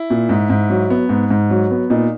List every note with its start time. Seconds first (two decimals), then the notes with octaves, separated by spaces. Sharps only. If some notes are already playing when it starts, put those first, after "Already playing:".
Already playing: E4
0.10 A#2
0.29 G#2
0.50 G#2
0.70 F#3
0.90 B3
1.09 G#2
1.30 G#2
1.50 F#3
1.71 B3
1.90 A#2 D#4